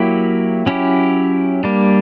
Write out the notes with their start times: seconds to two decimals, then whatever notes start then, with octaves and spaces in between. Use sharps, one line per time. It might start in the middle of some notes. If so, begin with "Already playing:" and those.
Already playing: F#3 A#3 E4 G4
0.66 F#3 C#4 E4 G4
1.64 G3 A#3 D4